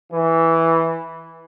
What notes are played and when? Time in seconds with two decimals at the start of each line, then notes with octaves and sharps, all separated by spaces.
0.13 E3